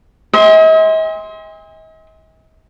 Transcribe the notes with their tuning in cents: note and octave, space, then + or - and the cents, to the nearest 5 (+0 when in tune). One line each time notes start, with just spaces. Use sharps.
D#5 +45 G#5 -40 C6 +0